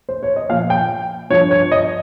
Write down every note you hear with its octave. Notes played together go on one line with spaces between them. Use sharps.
C5
C#5
D#5
A#2 F3 F5
G5
G2 F3 C#5
C#5
D#5